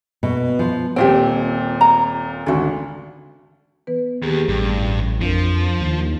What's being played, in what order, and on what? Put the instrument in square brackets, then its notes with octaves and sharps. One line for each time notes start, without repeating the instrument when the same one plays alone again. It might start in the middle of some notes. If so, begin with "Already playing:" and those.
[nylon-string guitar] B2
F3
[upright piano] D#1 A#2 C4 [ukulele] G4 D#5 G5
[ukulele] A#5
[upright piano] G#1 D2 [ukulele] F#4 A4
[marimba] E3 B3 B4
[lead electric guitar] D#2 [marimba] G4 G#4
[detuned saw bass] A1 [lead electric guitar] G2
[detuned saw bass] F2 [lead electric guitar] F3 [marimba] D4 A#4
[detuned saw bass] D#2